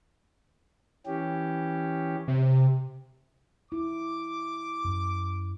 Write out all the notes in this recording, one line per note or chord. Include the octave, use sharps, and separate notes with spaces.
E3 C#4 G4
C3
E4 D6
F#2 C#4